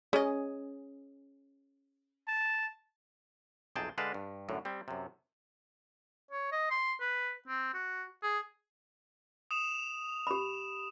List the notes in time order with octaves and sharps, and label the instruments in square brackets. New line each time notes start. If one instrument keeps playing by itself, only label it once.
[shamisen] C#4 D#5 [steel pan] G#4
[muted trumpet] A5
[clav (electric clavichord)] B1 F2 C3 G#4 G5 A5
D3 G#3 B4 D5 F5 A5
G2
F#2 A2 D3
G3 C4
F#2 C3
[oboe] C#5
D#5
C6
B4
C4
F#4
G#4
[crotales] D#6 E7 F7
[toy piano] G4 B5